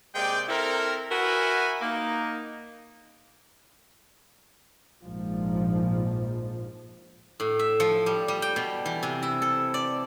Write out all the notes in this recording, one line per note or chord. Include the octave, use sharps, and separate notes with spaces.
C3 G#3 A#3 D5 G5
C4 E4 A4 A#4
F#4 A#4 B4 E5 F#5 G#5
A#3 D#4
A#1 G#2 F3
A2
E5
F3
G3
G3
G5
B2
E3
C3
E4
A4
D5